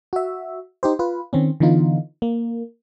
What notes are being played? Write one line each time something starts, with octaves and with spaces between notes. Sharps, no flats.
F#4 E5
D#4 G4 C5
F4 B4
D#3 C4 C#4
D3 E3 B3 D#4 F4
A#3